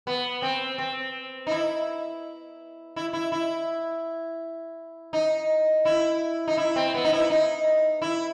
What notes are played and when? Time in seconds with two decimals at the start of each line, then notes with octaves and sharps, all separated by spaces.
0.07 B3
0.42 C4
0.78 C4
1.47 D#4
1.51 E4
2.96 E4
3.13 E4
3.32 E4
5.13 D#4
5.85 E4
6.48 D#4
6.57 E4
6.76 C4
6.94 B3
7.04 D#4
7.12 E4
7.30 D#4
8.02 E4